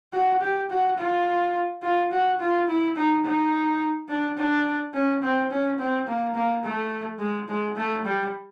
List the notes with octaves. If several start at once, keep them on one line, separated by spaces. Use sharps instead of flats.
F#4
G4
F#4
F4
F4
F#4
F4
E4
D#4
D#4
D4
D4
C#4
C4
C#4
C4
A#3
A#3
A3
G#3
G#3
A3
G3